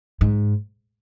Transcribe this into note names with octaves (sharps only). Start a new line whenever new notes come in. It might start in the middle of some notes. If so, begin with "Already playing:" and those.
G#2